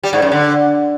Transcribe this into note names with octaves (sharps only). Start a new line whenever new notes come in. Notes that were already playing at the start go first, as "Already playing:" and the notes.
G3
G#2
F#2
D3